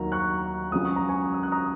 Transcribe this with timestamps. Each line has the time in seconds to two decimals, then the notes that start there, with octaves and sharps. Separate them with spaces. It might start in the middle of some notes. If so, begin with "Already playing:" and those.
Already playing: D#2 D#3 F#3 A#5
0.12 C#6 F#6
0.72 C#2 C#3 F#3 D#6
0.85 C#6
0.96 A#5
1.09 G#5 C#6
1.34 D#6
1.43 F#6
1.52 A#5 D#6